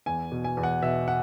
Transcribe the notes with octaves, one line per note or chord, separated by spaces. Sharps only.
E2 G#5
B2
G#5
E2
F#5
B2 E5
F#5